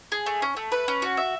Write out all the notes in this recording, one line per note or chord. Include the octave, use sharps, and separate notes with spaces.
G#4
A3
C#4
A3
B4
C#4
F#4
E5